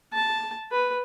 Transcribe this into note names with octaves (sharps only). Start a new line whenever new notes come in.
A5
B4